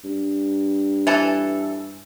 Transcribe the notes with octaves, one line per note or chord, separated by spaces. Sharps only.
G2
E3 A4